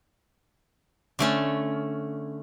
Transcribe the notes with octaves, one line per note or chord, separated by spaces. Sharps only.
D3 A3 C#4